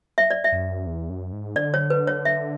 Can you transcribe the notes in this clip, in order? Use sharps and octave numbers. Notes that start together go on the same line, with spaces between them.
E5
D5
E5
F#2
E2
F#2
G#2
D3 D5
C#5
B4
C#5
E5